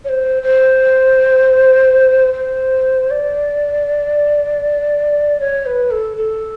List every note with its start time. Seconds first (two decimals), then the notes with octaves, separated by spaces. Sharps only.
0.05 C#5
0.09 C5
0.43 C5
2.34 C5
3.11 D5
5.40 C#5
5.66 B4
5.91 A4
6.17 A4